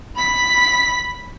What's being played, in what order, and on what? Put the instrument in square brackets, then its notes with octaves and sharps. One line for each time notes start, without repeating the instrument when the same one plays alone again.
[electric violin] B5 B6